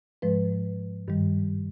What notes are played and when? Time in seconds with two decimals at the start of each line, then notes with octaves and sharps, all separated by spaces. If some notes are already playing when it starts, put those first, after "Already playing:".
0.22 G#2 F3 G#3 B4
1.08 G2 D#3 G3